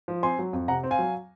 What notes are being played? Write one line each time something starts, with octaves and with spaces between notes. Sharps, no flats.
F3
C4 G#5 C6
F#3
F2
C3 F#5 A#5
C4
F5 G#5
F#3